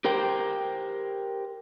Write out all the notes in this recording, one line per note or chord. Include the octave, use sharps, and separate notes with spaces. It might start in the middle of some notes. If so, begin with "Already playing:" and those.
G4 A#4 C5 G5